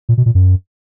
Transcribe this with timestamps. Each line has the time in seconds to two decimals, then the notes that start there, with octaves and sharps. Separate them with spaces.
0.09 A#2
0.18 B2
0.26 A#2
0.35 F#2